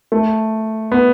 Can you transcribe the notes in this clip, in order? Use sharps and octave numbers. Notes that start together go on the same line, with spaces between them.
A3
B3